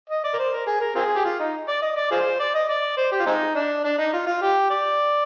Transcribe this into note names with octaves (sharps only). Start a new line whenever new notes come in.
D#5
D5
A#4
C5
A#4
G#4
A#4
C4 F4 G#4
G4
F4
D#4
D5
D#5
D5
F4 G#4 C5
D5
D#5
D5
C5
G4
F4
G#3 C4 D#4
D4
D4
D#4
F4
F4
G4
D5